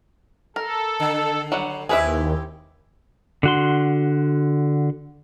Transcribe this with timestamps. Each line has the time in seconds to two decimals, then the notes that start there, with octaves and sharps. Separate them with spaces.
0.56 A4 A#4
1.00 D3
1.52 F#3 G3 F#5
1.89 D#2 C4 E4 G4 G#4 B4 E5
3.43 D3 F#4 C6